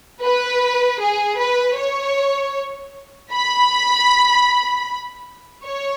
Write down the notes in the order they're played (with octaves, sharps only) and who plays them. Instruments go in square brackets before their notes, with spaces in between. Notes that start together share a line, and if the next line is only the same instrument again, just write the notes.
[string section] B4
G#4
B4
C#5
B5
C#5